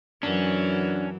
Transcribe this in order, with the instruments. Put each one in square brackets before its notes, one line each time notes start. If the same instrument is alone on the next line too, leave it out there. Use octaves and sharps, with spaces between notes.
[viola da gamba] F#2 E3 F#3 [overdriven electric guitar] C#4 [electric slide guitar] D4